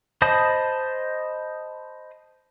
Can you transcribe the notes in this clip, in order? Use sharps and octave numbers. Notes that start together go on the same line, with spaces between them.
C5 D#5 A5 B5 D#6